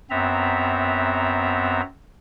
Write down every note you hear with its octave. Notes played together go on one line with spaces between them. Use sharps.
F#2 B3 C4 E5 A#5